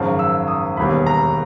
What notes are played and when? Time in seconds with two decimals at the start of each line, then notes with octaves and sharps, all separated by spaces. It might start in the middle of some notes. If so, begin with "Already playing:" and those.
Already playing: G#1 F#2 C#3 F3
0.19 E6
0.48 D#6
0.77 E1 D#2 D#3 G3 B3 B5
1.07 A#5